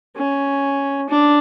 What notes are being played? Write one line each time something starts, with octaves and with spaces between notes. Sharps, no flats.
C#4
D4